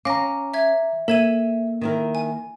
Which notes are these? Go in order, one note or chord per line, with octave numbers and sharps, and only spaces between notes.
C#4 F5 A#5 D6 A#6
E5 G#6
A#3 A4 E5 G#6 D#7
D#3 E4 A#4
G#5